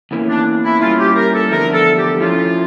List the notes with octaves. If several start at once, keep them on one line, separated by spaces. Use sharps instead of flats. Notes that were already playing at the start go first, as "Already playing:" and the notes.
E2 E3 A#3 C#4
D4
E4
G3 A#3 C#4 E4 F4
G4
A#4
A4
E2 D3 F3 A3 A#4
A4
G4
F3 A3 C#4 E4 F4